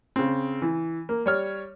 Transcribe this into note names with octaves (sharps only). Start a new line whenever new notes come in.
C#3 C4
E3
A#3
G3 C#5 F6